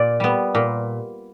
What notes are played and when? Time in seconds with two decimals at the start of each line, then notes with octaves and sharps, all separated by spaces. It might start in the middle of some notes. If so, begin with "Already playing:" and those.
Already playing: A#2 D5
0.20 G3 B3
0.55 A#2